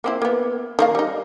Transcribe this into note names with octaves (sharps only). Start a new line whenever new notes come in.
A#3 C4 E4
A#3 B3
D#3 A#3 F5
G3 D#4